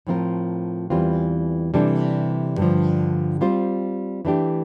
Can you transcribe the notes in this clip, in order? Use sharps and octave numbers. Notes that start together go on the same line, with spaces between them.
A2 F3 C4 F4 A#4
E2 E3 G3 C4 F4
C3 E3 G3 D4 A4
G2 D3 F3
G3 C4 F4 C5
E3 A3 D4 G4